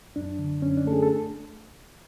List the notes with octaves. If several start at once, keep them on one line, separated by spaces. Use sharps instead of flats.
F#2 D4
D3
F#2 C#4
D4
A3 A4
G#4
A4